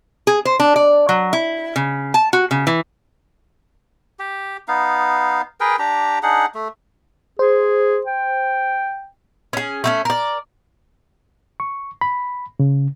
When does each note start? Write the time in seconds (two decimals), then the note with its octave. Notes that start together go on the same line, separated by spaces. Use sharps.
0.27 G#4
0.45 C5
0.60 D4
0.76 D5
1.09 F#3
1.33 E4
1.76 C#3
2.14 A5
2.33 F#4
2.51 C#3
2.67 E3
4.19 G4
4.68 B3 D#4 F5
5.60 G#4 A#4 B4 G5
5.79 D4 G4 A#5
6.23 D4 D#4 G#4 F#5
6.55 A3
7.39 G#4 C5
8.06 G5
9.53 C#4 G#4
9.84 A3 C4 C#4
10.05 A#4 D5
11.60 C#6
12.01 B5
12.60 C#3